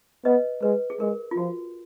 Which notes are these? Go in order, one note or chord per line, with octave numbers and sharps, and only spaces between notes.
B3 B4 D#5
G#3 B4
G#4
G#3 A#4
F4
F3 F#4